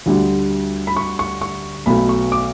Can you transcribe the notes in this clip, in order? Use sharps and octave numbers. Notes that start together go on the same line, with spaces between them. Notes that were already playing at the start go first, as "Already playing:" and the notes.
D2 D3 G3
B5
C#6
C#6
C#6
B1 B2 A3 B5
C#6
D6